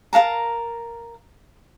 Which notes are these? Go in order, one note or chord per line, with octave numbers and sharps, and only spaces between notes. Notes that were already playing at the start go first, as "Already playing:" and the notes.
A#4 F5 A5 A#5